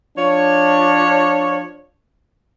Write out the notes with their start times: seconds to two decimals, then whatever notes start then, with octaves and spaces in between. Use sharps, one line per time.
0.17 F3 D4 C#5